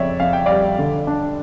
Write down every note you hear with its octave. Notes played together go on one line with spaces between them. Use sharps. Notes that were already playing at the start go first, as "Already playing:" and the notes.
Already playing: F2 C#3 C#5 D5 E5
F2 F5
G5
G3 D5 F5
D3
D4